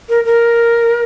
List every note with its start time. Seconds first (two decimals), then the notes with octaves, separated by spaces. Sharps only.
0.09 A#4
0.25 A#4